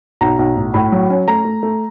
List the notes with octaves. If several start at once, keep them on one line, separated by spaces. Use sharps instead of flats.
B1 A#5
B1
A2
A2 B5
F#3
C#4
A3 A#5
A3
A3